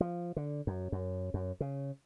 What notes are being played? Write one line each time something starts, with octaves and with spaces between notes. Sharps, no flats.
F3
D3
F#2
F#2
F#2
C#3